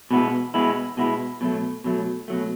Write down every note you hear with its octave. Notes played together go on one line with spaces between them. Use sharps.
B2 G#3 B3 E4
B2 G#3 B3 E4
B2 G#3 B3 E4
B2 F#3 A3
B2 F#3 A3
B2 F#3 A3